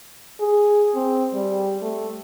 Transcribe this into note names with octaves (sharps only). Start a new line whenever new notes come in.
G#4
C4
G3
A3